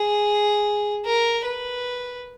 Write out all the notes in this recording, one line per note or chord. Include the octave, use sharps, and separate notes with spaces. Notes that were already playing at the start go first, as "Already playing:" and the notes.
Already playing: G#4
A#4
B4